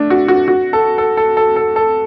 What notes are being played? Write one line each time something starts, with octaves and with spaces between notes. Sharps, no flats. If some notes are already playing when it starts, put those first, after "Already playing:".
Already playing: A3 D4
F#4
F#4
F#4
A4
A4
A4
A4
A4
A4